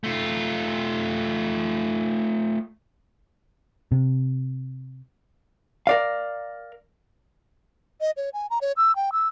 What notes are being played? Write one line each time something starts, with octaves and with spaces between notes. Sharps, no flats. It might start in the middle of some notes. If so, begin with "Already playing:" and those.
A3 F4
C3
A#4 D5 F5
D#5
C#5
G#5
A#5
C#5
E6
G5
E6